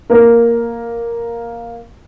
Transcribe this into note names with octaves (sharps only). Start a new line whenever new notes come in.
A#3 A#4